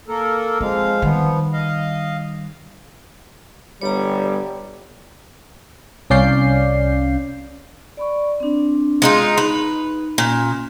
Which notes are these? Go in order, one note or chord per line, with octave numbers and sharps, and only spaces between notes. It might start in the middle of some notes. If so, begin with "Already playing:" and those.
A#3 A4 A#4
F3 G#3 C4 F5
D#3 F3 G3 B3
D#5 F5
G1 G3 C#5 A#5
C2 C#4 D5 F5 G6 C7
D5 B5 C#6
C4 D4
G#3 D#4 F4
D#4 B4
A#2 C#4